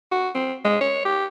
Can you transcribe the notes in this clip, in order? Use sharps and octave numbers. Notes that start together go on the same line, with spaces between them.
F#4
C4
G#3
C#5
G4